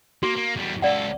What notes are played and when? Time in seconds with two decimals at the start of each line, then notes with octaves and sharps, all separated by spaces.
0.23 A#3 F#4
0.36 A#3
0.56 E2 G3
0.82 C#2 A4 D5 F5 F#5